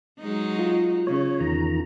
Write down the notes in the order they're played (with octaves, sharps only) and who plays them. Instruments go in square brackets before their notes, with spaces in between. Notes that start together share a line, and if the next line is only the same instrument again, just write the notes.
[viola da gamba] F#3 G#3 D#4
[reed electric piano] F4
[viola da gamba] C#3 [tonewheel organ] C#5
[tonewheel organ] E2 D#3 A#5